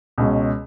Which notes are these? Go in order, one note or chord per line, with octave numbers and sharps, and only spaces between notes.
C#2 B2 G#3 C#4